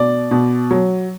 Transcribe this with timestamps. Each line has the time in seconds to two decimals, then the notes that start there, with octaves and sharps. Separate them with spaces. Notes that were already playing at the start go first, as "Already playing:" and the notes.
Already playing: B2 D5
0.31 B2
0.71 F#3